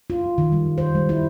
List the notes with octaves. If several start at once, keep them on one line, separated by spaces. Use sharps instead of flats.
F4
D#3
G3
C5
G3
E4